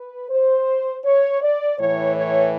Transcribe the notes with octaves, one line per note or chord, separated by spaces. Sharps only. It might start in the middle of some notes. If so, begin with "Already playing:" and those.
Already playing: B4
C5
C#5
D5
A2 E3 C#5
C#5